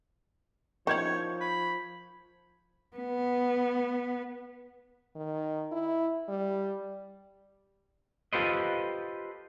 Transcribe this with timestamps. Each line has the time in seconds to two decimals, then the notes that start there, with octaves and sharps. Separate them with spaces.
0.87 D#3 F3 C#4 E4 C#5 C#6 G6 G#6
1.41 B5
2.97 B3
5.16 D#3
5.72 E4
6.29 G3
8.33 F4 G4 A4 B4 C5 D#5